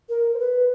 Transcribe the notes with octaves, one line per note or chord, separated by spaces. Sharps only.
A#4
C5
B4